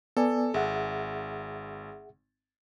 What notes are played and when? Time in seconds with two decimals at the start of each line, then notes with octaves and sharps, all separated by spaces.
0.17 B3 A4 D5 G#5
0.54 G#1 G#4 E5 F#5